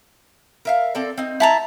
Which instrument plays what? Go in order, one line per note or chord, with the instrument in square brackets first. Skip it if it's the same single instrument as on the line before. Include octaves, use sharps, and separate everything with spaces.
[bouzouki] A#4 E5 F5
C4 A4 D5
C4 D#4
[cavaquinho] E4 A5 A#5